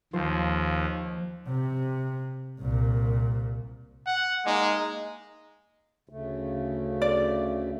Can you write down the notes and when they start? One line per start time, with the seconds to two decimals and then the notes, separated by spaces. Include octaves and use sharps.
0.13 D#2 F3 C5
1.48 C3
2.60 C2 A#2
4.06 F#5
4.46 G#3 A#3 D#4 A#5
6.09 D2 C#3 A3
7.02 D5